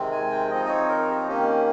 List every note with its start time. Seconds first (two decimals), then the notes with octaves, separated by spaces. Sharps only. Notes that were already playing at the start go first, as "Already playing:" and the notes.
Already playing: C3 D#3 G#3 C4
0.12 G#5
0.31 G5
0.50 F3 C4 D#4 D#5
0.65 D#5
0.69 C#5
0.89 A#4
1.09 G4
1.28 D#3 A#3 C#4 G4